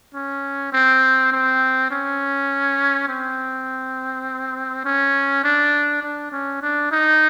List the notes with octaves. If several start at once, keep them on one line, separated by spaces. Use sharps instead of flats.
C#4
C4
C4
C#4
C4
C#4
D4
D4
C#4
D4
D#4